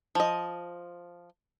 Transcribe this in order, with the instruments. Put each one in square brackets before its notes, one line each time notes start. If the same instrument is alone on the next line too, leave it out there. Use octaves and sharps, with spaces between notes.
[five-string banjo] F3 D#5